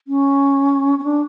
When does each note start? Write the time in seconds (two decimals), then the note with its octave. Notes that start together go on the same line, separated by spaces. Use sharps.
0.08 C#4
0.99 C#4
1.04 D4